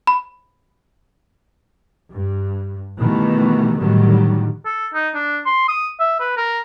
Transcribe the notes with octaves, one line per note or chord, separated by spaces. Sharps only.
B5
G2
B2 D#3 E3 G3 A3 B3
A2 D3 D#3 F#3 G3
A4
D#4
D4
C6
D#6
E5
B4
A#4